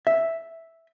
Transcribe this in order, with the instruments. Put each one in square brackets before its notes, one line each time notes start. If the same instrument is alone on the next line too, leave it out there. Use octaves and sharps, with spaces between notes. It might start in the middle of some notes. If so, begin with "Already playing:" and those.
[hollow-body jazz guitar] E5